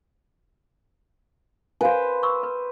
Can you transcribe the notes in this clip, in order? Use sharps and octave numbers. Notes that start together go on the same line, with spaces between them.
B4 C5 F5 G#5
C#6 E6
B4